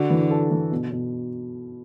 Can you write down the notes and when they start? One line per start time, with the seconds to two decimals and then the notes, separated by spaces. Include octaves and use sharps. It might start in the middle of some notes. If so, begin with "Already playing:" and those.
Already playing: D3 F#4
0.10 E3
0.31 A4
0.51 E3
0.72 B2
0.91 B2